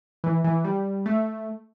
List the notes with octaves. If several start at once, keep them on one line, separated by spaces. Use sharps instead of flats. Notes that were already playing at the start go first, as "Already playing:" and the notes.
E3
E3
G3
A3